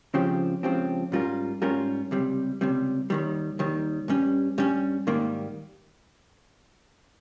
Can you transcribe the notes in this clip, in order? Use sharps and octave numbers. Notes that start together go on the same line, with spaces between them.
C#2 C#3 F3 C4 G4
C#2 C#3 F3 C4 G4
G#2 G3 C#4 F4 A#4
G#2 G3 C#4 F4 A#4
C#2 C3 G3
C#2 C3 G3
D#2 D#3 G3
D#2 D#3 G3
G2 G3 C#4
G2 G3 C#4
G#2 D#3 G3 A#3